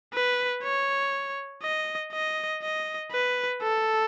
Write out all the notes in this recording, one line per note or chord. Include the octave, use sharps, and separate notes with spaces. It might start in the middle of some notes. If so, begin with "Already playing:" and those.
B4
C#5
D#5
D#5
D#5
B4
A4